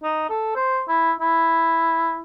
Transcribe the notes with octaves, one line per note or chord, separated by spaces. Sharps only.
D#4
A4
C5
E4
E4